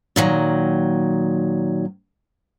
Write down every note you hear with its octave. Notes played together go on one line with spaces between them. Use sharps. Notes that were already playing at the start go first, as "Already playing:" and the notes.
A#2 D#3 F#3